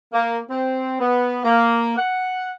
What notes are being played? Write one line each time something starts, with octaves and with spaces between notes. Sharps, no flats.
A#3
C4
B3
A#3
F#5